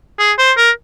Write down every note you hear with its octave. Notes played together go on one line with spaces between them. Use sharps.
G#4
C5
A#4